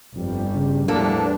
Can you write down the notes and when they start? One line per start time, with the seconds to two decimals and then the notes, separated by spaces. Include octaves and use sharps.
0.16 G1 F2 G3
0.55 C#3
0.88 E2 A2 F3 G3 A#3 D4 A4